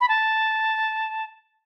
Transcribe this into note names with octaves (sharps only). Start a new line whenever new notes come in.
B5
A5